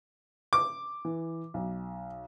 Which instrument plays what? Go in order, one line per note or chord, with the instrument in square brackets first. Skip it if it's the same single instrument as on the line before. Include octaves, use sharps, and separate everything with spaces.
[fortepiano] D6
[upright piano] E3
B1